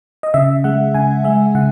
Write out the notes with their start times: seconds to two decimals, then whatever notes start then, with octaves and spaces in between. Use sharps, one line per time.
0.23 D#5
0.34 C#3 E5
0.64 G#3 F#5
0.94 C#3 G#5
1.24 G#3 E5
1.55 C#3 F#5